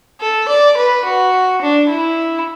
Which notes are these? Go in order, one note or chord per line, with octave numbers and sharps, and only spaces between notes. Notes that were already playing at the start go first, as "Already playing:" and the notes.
A4
D5
B4
F#4
D4
E4